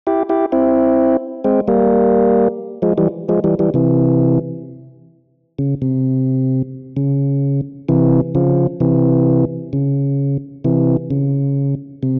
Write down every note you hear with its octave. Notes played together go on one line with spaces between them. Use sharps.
E4 G4
E4 G4
C4 E4
G#3 C4
G3 A#3
F3 G#3
E3 G3
F3 G#3
E3 G3
E3 G3
C3 E3
C#3
C3
C#3
C3 E3
C#3 F3
C3 E3
C#3
C3 E3
C#3
C3